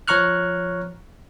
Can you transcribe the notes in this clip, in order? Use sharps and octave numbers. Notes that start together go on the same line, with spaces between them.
F3 C#5 A#5 C#6 F6 F#6